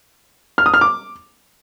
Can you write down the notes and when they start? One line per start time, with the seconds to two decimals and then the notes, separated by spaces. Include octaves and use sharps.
0.58 F6
0.66 D#6
0.74 F6
0.81 D6